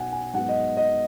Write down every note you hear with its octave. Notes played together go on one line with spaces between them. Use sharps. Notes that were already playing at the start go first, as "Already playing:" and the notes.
Already playing: B1 B2 F#3 F#5 G#5
G#5
G#2 F#3 B3 F#5
D#5
D#5